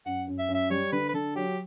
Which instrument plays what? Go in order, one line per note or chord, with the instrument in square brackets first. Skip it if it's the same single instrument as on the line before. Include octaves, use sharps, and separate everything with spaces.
[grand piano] F#2 [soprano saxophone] F#5
[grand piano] F#2
[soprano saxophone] E5
[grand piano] F#2
[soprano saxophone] E5
[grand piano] G3 [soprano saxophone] C#5
[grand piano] D3 [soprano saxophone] B4
[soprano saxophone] B4
[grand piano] D3 [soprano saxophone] A4
[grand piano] F#3 [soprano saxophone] G4